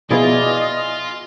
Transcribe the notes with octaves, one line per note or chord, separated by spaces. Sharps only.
B2 F3 B3 E4 F4 G#4 D5 D#5